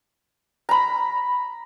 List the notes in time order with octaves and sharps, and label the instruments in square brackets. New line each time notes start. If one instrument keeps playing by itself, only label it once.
[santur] A#5 B5